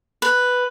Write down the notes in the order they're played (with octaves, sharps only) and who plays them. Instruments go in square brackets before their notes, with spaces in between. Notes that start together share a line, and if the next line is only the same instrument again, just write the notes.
[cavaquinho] B4